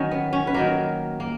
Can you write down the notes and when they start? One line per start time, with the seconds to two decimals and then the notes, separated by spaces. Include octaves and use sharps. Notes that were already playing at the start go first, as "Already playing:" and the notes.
Already playing: D#3 F#3 C#4
0.11 B3
0.33 C#4
0.47 B4
0.54 D#3 F#3 A#3 A#4
1.20 A#3